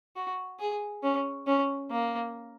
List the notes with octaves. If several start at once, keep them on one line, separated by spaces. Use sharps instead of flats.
F#4
G#4
C#4
C#4
A#3